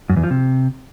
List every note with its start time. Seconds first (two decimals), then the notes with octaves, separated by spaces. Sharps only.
0.10 F#2
0.16 E2
0.23 F3
0.30 C3